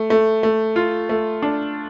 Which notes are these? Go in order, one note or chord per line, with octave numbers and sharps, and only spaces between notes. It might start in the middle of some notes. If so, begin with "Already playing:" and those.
Already playing: A3
A3
A3
F4
A3
D4